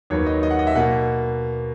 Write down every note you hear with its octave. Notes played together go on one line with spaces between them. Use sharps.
D#2 D#3 F#3 B3 C#5
D#5
D#5
F#5
D#5
E5
B2 A#3 F#5